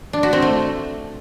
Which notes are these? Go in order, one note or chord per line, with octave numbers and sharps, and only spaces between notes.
D4
F#4
C4
A3